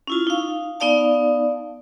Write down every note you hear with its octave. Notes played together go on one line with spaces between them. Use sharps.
C#4 E4 F4
D#4 F5
B3 D#4 D5 F5 A5